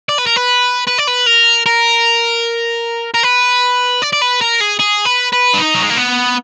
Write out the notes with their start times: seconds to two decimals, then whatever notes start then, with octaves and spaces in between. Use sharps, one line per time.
0.09 D5
0.18 B4
0.26 A#4
0.36 B4
0.87 B4
0.98 D5
1.07 B4
1.26 A#4
1.66 A#4
3.14 A#4
3.23 B4
4.02 D5
4.13 D5
4.21 B4
4.41 A#4
4.60 G#4
4.80 G#4
5.06 B4
5.32 B4
5.53 D4
5.58 D#4
5.74 F#3
5.83 G#3
5.90 A#3
5.97 B3